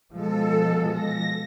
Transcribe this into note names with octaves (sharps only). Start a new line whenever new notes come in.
B2 F3 G#3 A4
A#6